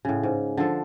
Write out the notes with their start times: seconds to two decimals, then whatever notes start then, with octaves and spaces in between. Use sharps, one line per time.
0.05 A2 C#3
0.23 G#2
0.57 D3 F3 A4